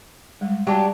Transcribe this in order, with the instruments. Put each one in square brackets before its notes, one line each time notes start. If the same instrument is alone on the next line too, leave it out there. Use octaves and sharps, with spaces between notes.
[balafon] G3 G#3
[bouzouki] F#3 D4 G4 [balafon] G3 A5